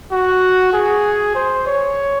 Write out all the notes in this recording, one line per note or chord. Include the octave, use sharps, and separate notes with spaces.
F#4
G#4
C5
C#5